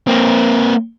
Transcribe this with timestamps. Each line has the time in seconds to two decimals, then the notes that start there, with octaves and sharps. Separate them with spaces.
0.07 A#3 C4